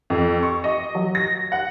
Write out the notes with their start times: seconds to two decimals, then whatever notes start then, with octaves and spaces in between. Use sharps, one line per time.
0.10 F2
0.43 C#6
0.64 D#5
0.95 F#3
1.15 A#6
1.52 F#5